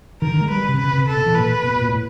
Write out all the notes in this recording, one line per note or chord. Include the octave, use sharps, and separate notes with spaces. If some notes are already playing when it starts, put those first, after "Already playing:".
D#3 A#4
D3
G#3
G3 B4
C3
C#3 B4
C3
A4
B2
E3
A#2 B4
B2
A#2
A2